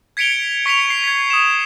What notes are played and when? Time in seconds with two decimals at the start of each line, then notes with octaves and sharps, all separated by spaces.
0.17 G#6 B6 C#7 D7 F7 G7
0.66 C#6 B6 C#7 F7
0.90 C7
1.04 G#6 B6
1.30 D#6 E7